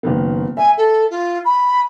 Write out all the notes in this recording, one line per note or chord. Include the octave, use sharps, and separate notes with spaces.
F#1 D#3 B3
E5 G#5
A4
F4
B5